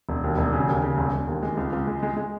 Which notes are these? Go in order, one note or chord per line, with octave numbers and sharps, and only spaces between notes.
E1
D#2
E1
C#3
D#2
C#3
E1
E1
D#2
G#3
C#2
C#2
G#3
G#3
G#3